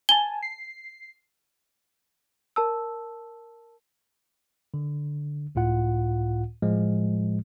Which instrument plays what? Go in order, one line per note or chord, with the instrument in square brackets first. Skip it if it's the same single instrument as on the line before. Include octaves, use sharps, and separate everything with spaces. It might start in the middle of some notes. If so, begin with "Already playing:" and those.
[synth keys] G#5 A5 [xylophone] G7
[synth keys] C7
[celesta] A#4 A5 E6
[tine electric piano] D3
C#2 A2 F4 F#5
A2 F3 G#3